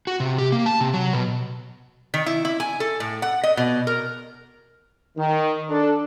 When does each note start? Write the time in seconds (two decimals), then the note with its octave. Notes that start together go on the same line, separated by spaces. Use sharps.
0.07 F#4
0.20 C3
0.38 G4
0.52 A#3
0.66 A5
0.81 C3
0.94 F#3
1.13 B2
2.14 D#3
2.26 E4
2.45 E4
2.60 G#5
2.80 A4
3.00 A2
3.22 F#5
3.43 D#5
3.57 B2
3.87 A#4
5.18 D#3
5.70 D4 A4